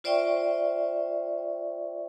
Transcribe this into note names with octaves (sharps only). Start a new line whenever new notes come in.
F4 C5 D5 E5 G5 C#6